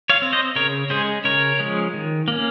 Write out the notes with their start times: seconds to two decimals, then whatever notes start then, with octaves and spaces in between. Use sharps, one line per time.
0.10 C#5 F5
0.22 C4
0.33 C5 D#5
0.56 C#3 A#4 C#5
0.90 G#3 C#4 G#4 C5
1.24 C#3 A#4 C#5
1.59 F3 G#3 C#4
1.94 D#3
2.28 A#3 C#4